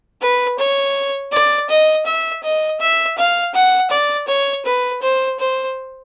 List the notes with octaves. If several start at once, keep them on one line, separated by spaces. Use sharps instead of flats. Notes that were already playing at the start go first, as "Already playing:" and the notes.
B4
C#5
D5
D#5
E5
D#5
E5
F5
F#5
D5
C#5
B4
C5
C5